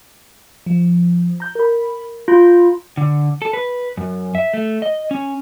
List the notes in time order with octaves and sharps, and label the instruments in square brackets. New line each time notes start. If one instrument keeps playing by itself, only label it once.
[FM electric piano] F3
A#5 G6
A#4 B5
[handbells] F4 [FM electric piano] A#5 B5 G6
[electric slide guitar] D3
A4
B4
F#2
E5
A3
D#5
C#4